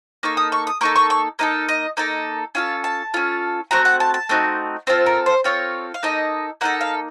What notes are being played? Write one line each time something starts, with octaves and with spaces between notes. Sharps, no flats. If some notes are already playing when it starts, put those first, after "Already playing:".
A#3 D#4 A4 C#6
D#6
C#6
D#6
A#3 D#4 A4 C#6
C#6
C#6
A#3 D#4 A4 D#5
D#5
A#3 D#4 A4 D#5
C#4 F4 A4 F5
A5
C#4 F4 A4
A3 C4 F#4 A#5
F#5
A5
A5
A3 C4 D#4 F#4
C4 F4 A4 C5
A#4
C5
C4 F4 A4 C#5
F5
A#3 D#4 A4 D#5
A#3 D#4 A4 F#5
F5